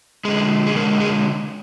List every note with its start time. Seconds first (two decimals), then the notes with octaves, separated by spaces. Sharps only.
0.25 D3 G#3 G#4
0.67 G#4
0.76 D3 G#3 A#4
1.00 G#4